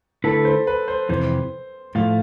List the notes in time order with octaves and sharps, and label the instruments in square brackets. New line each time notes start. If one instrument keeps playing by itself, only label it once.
[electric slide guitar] D3 A3 E4 B4 [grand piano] A4
[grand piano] C5
B4
C5
[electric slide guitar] F2 C3 E3 [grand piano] C5
[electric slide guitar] A2 F3 A3 [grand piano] F5